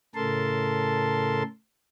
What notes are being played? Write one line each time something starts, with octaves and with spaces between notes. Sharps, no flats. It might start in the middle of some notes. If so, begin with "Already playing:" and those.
A2 C#3 A4 A#4 A5 C6